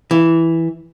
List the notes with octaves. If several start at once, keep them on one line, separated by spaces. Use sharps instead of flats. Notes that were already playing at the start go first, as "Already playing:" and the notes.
E3